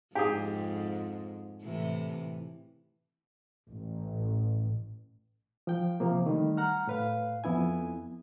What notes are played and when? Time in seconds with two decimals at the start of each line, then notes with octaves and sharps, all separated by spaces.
0.15 F2 G#2 G4 G#4
1.62 A2 C3 E3
3.68 A1
5.67 F3 G5
6.00 C3 F3 A#3
6.26 D#3 G3 A3
6.57 F#5 A#5 F6
6.87 A2 B4 F5
7.44 F2 B3 E4 G#5